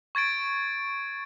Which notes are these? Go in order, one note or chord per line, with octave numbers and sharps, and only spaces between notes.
C#6 G#6 A6 D7